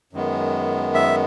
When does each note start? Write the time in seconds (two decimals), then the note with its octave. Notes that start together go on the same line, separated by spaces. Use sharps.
0.13 F#2 D#3 G#3 B3
0.94 E5